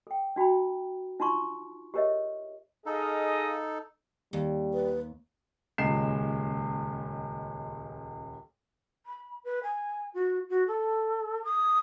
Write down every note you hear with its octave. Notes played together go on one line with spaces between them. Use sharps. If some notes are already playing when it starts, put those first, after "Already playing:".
A4 G5
D4 F#4 G5 A#5 B5
D4 D#4 F4 A5 C6 C#6
G4 G#4 A#4 C#5 D#5 E5
D#4 G#4 A4 D#5 F5
D#2 G3
B4
D#1 C#2 C#3 G#3 C7 E7
B5
B4
G#5
F#4
F#4
A4
D#6